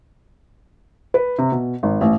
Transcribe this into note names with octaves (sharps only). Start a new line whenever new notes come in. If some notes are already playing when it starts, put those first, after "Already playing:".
B4
C3
B2
G#1
A1